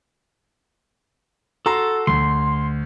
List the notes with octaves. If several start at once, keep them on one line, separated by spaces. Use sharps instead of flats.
F#4 A4 A#5 C6
D2 C6